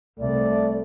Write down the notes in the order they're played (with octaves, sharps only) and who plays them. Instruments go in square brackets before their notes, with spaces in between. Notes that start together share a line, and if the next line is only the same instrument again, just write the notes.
[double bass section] C2 [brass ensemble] A3 [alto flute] D5